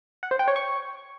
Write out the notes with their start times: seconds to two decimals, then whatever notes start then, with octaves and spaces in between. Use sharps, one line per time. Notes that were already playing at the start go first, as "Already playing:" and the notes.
0.23 F#5
0.31 C5
0.39 G5
0.48 C#5
0.56 C#6